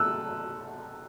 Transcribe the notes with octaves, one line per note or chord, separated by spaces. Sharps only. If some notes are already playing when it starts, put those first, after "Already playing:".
Already playing: A3 E6 F#6